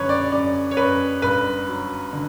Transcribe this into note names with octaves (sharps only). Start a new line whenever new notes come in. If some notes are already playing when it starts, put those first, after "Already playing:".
Already playing: F#2 D3 B4 C#5
D5
F#2 D5
C#5
F#2 B4
G1 B4
F#3
D3